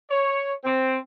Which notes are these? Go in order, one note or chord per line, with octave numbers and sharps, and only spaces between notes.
C#5
C4